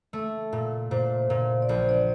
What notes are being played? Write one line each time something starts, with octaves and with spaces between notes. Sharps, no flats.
A3
A#2
A#2 C5
A#2
D5
A#1 C5
D5